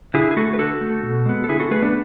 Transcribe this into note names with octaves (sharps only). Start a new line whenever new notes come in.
D3 E4 G#4
G#4
A3 F#4 A4
B4
D3 F#4 A4
A3
B2
G#3 B3
A4
D3 E4 G#4
F#4 A4
A3 G#4 B4
B3 D4